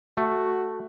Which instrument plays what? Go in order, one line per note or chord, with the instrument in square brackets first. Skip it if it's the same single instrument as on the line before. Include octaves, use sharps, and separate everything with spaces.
[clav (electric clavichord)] A3 [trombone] F#4